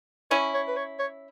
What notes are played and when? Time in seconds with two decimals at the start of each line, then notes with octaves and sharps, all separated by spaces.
0.31 C#4 E4 C#5
0.54 C#5
0.67 B4
0.76 C#5
0.99 C#5